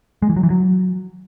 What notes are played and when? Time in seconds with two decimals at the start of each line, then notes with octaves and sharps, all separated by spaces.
0.22 G#3
0.29 E3
0.36 F#3
0.43 E3
0.50 F#3